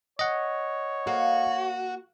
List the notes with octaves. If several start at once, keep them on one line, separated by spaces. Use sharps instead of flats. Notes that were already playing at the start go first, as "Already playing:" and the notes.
C#5 D#5 F#5
A#3 F#4